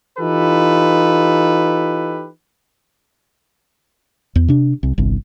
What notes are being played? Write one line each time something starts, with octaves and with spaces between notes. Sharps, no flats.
E3 D#4 F4 G4 A4 B4
E2
C3 D4
C2
G1 C2